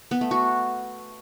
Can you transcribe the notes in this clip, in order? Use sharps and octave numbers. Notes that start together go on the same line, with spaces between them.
B3
A3
F#4